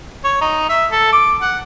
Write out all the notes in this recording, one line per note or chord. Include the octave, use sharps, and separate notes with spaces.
C#5
D#4
E5
A4
D6
F#5